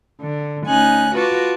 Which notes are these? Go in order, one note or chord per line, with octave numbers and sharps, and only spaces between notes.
D3
D2 C#4 D#4 G#5 F#6
F4 F#4 B4 A5 D6